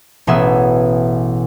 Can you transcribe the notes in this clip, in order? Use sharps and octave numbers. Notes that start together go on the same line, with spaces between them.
A1 B2 B3 G#4 E5